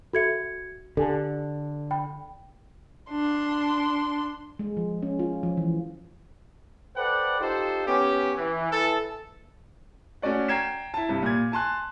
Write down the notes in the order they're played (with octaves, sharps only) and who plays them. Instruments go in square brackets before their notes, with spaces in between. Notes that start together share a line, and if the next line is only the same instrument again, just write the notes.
[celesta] F#4 G#6 C#7 [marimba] A4 E5
[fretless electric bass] D3 [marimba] G4 G#5 A5 [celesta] A4
[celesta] G5 [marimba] B5
[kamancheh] D4 C6
[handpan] G#3
F3
C#4
F4
F3
E3
[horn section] A4 B4 C5 D5 F#5 G5
D#4 F4 G4 A4 C5
B3 C#4 G4
E3
E3 A4
[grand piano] A3 C#4 F#4 D5 F#5
G5 A#5 G#6 C7 E7
E4 A5
G2 C3
A#2 G#6
G#5 A5 C6 F#6